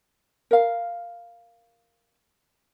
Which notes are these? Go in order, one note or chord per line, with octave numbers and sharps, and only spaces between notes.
A#4 F5